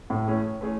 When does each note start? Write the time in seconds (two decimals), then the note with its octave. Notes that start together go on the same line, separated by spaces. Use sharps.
0.10 A2
0.27 E3 A3 C#4 G#4 C#5
0.60 E3 A3 C#4 G#4 C#5